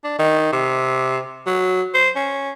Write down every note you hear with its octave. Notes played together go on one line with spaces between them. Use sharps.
D4
D#3
C3
F#3
C5
C#4